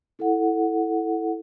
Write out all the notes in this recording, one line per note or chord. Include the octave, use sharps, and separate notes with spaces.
E4 A4 F#5